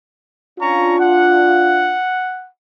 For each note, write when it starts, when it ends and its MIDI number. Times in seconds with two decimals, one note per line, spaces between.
0.59 0.99 61
0.59 1.96 62
0.59 1.96 65
0.59 0.99 82
0.59 0.99 85
1.00 2.48 78